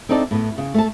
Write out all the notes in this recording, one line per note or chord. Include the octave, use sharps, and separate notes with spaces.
C4 D4 D#4 A4 D5
A2 B3
C#3
A3 A5